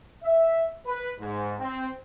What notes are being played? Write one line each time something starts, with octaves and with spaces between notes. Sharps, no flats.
E5
B4
G#2
C4